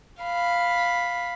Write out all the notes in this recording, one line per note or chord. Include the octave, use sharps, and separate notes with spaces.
F5 B5